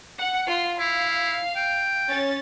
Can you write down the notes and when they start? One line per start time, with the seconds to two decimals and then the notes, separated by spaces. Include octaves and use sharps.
0.18 F#5
0.47 F4 C6
0.79 E4 F5
1.56 G5
2.08 C#4 A6